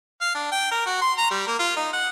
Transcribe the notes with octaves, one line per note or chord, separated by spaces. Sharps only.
F5
D4
G5
A#4
F#4
C6
A#5
G3
A#3
F4
D#4
F#5